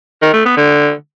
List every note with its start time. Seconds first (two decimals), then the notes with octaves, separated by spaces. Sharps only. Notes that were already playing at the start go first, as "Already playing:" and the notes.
0.22 D#3
0.34 A3
0.45 B3
0.57 D3